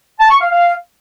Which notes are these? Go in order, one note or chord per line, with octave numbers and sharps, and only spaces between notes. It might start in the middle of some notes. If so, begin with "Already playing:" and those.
A5
C#6
F5
F5